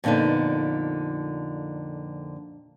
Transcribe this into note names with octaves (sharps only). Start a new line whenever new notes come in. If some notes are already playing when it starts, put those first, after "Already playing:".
F2 A#2 D3 B3 D#4